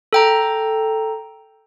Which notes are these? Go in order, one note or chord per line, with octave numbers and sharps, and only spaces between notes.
A4 G5 A#5